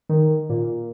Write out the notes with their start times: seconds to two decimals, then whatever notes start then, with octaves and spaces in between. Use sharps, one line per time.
0.09 D#3
0.50 A#2